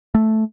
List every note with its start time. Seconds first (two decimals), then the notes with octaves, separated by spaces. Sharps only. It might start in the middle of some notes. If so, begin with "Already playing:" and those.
0.15 A3